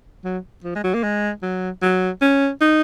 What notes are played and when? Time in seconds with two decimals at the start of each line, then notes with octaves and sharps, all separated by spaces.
0.24 F#3
0.64 F3
0.75 G#3
0.84 F#3
0.94 A#3
1.03 G#3
1.42 F#3
1.82 F#3
2.21 C#4
2.61 D#4